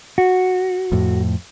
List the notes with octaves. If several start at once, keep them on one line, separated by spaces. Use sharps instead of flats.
F#4
F2 A2